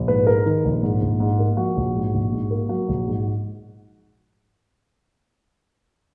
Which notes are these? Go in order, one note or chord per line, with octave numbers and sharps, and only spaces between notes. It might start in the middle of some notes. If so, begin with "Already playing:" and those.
Already playing: A#1
G#2 B4
G#3 A#4
D#3
A#1
G#2
A#1
G#2
A#3
F3 F#4
A#1
G#2
A#1
G#2
A#3
F#3 F#4
A#1
G#2